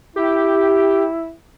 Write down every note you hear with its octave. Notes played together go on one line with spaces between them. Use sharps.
E4 G4